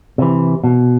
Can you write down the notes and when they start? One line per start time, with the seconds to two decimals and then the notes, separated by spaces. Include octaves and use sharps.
0.18 C3 E3
0.64 B2